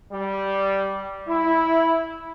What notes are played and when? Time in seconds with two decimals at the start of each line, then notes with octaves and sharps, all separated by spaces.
0.13 G3
1.28 E4